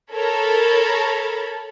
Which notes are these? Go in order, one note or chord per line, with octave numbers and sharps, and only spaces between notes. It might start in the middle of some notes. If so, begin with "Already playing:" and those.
A4 A#4 C#5 B5